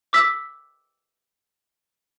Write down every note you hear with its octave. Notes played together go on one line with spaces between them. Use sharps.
D6 E6 B6